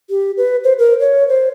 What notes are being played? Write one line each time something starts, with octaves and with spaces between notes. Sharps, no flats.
G4
B4
C5
A#4
C#5
C5